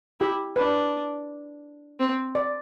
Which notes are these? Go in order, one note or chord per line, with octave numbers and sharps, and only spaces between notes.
E4 G4
D4 B4
C4
D5